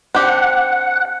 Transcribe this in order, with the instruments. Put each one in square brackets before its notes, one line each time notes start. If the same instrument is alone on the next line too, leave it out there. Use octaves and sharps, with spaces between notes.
[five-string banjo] C4 D4 G4 [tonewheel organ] F#5